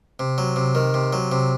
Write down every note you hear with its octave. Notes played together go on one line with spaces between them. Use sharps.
C3
F#3
C3
D#3
C3
F#3
C3